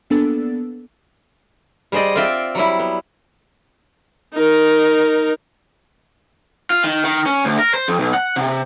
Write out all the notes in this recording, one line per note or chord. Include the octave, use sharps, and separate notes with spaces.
A#3 B3 D4 A4 E6 A6
G3 G#4 C5 D5 D#5
C4 F4 D5 E5 G5
F#3 G3 E4
B3
D#4 A#4
F4
D#3
D#3
C#4
D2
A#4
C5
F2
B1
F#5
C3